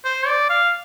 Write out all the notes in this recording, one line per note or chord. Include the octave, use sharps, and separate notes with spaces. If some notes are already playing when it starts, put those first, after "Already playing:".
C5
D5
F5